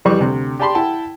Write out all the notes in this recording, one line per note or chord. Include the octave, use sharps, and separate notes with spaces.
F2 E3 G3 C#6 D6
D2 C3
G4 D5 G5 A5 B5 C6
E4 F#5 G5 A5